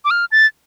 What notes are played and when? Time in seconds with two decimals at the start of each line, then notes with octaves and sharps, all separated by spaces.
0.05 D6
0.11 F6
0.32 A6